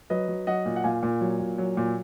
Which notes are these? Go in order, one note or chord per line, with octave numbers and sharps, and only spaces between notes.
F#3 B4 D#5
F#3
F#3 D#5 F#5
A#2
F#5
A#2 F5 G#5
A#2
F#3
A#2
F#3
A#2